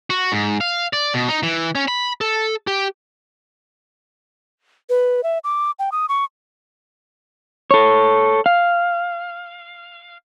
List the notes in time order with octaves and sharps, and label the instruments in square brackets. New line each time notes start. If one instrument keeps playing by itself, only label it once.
[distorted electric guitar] F#4
G#2
F5
D5
B2
D#4
E3
C#4
B5
A4
G4
[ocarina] B4
E5
D6
G5
D#6
C#6
[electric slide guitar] A4 C#5
F5